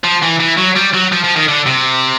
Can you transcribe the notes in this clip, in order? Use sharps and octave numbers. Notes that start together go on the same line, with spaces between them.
F3
E3
E3
F#3
G3
F#3
F3
F3
D#3
D3
C3